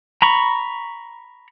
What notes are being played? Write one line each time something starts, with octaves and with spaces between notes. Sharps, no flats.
A#5 B5 C#6